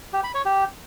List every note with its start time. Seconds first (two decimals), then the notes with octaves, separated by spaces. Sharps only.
0.13 G4
0.24 B5
0.34 C#5
0.45 G4